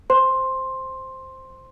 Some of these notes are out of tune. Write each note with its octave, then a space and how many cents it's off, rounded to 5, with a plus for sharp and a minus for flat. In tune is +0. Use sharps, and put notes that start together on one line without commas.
C5 +0 C6 +10